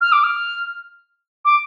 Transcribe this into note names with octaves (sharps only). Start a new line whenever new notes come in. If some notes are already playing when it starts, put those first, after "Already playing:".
F6
D6
F6
D6